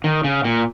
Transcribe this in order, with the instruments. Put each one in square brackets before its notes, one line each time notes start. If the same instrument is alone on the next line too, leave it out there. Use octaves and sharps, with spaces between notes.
[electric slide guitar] D#3
C#3
A#2